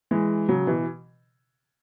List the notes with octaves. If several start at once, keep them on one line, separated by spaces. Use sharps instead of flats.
E3 G#3
C#3 F#3
B2 E3